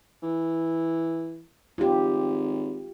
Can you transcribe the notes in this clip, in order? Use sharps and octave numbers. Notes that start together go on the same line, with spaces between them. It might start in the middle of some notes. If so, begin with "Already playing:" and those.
E3
G#1 F4 G4